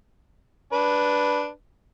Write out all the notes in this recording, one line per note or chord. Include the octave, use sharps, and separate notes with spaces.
D4 B4